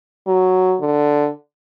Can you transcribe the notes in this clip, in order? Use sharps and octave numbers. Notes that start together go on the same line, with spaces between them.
F#3
D3